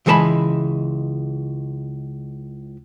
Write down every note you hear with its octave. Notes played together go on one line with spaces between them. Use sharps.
C#2 E3 G#3 A#4 A5 B5